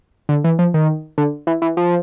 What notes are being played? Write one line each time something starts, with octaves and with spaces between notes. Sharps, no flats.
D3
E3
F3
D#3
D3
E3
E3
F3